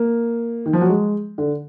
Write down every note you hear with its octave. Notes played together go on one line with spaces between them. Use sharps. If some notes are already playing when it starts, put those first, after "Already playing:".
Already playing: A#3
D#3
F3
F#3
G#3
D3